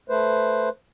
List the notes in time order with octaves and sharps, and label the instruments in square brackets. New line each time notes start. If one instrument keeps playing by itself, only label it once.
[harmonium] A3 B4 C5